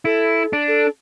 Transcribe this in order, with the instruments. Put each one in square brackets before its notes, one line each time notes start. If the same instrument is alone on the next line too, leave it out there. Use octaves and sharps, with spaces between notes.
[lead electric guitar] E4 [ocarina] A4
[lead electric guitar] D4
[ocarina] A4